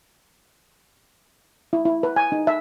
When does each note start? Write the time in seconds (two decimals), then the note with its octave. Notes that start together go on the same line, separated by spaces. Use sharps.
1.73 E4
1.85 E4
2.03 B4
2.16 G#5
2.32 D#4
2.47 E5